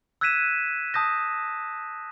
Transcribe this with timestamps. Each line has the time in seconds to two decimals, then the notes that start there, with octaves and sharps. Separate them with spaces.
0.21 E6 F#6 G#6 B6 D#7 E7
0.94 A5 D#6 G6 A#6